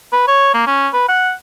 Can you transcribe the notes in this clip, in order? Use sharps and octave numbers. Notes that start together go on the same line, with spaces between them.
B4
C#5
A#3
C#4
B4
F#5